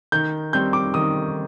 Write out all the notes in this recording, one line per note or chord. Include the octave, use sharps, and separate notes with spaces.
D#3 G6
G3 C4 G6
D6
D#3 D#6